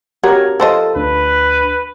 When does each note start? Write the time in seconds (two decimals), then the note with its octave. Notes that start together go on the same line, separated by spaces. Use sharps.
0.24 F#4 G4 A#4 C#5 G#6
0.60 F3 A4 C5 D#5 A5
0.96 D2 D4 B4